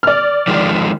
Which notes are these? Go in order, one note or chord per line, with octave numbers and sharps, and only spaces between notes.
D5 F6
D#3 F3 G#3